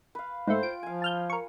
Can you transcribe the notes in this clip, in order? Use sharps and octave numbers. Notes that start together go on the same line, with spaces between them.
B4 F5
G#2 A3 C5 G5
F4 D7
F3 F5 G#5
A5 F6 G6
A#4 C#6